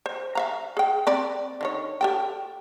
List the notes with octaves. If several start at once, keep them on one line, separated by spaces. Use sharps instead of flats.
C5
E5 F5 A#5
G#4 G5
C4 D5 B5
D3 D#3 C#5
G4 A4 G5